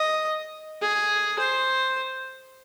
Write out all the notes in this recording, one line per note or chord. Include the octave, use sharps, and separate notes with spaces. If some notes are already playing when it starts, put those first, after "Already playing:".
Already playing: D#5
G#4
C5